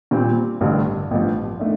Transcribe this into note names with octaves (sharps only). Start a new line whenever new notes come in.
A#2 G3 C4 F4
A1 G2 D3 G3 D4
A1 G2 F3
D#3 A3 D4